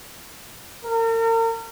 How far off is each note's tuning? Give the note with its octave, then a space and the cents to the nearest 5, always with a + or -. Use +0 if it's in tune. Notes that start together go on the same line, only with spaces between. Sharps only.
A#4 -40